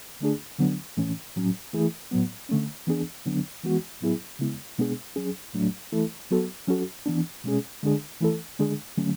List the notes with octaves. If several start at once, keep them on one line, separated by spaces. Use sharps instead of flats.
D3 A3 D4 G#4
D3 F#3 B3 D4
A2 E3 A3 C#4
A2 F#3 C#4
E3 A3 E4 G#4
A2 F#3 B3
D3 A3 C#4
E3 B3 D4 G#4
D3 F#3 B3 D4
E3 G#3 B3 F#4
A2 F#3 B3 E4 G#4
C#3 G#3 B3 E4
B2 G#3 B3 D4 G#4
F#3 C#4 G#4
A2 F#3 A3 D4
E3 A3 E4 A4
F#3 B3 F#4 A4
F#3 C#4 F#4 A4
E3 B3 D4
B2 G#3 C#4 G#4
D3 G#3 D4 G#4
E3 A3 E4 A4
D3 G#3 D4 G#4
D3 F#3 A3 C#4